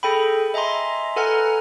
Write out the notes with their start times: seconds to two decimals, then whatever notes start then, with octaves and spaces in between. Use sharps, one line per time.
0.03 G#4 A4 G5 B5
0.54 D#5 E5 G#5 A#5 C6
1.16 A4 B4 F#5 G#5 A#5 F6